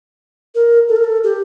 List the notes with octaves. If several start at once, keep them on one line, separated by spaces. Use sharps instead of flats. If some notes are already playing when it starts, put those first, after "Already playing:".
A#4
A4
A#4
A4
G4